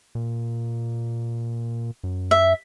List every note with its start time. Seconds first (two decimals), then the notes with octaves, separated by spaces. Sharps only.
0.15 A#2
2.04 F#2
2.31 E5